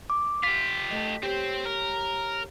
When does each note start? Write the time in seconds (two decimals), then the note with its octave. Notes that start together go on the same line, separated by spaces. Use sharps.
0.10 D6
0.43 F4 G4 B6
0.91 A3 D#5
1.23 C4 G4 C5 C#5
1.66 A#4